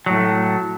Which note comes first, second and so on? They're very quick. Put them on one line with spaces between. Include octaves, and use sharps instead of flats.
F#3 A2 A3